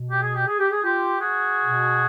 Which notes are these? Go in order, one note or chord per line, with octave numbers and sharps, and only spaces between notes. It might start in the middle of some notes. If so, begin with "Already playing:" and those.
Already playing: B2
G4
G#4
G4
G#4
G4
G#4
F4 G4
F#4 G#4
B2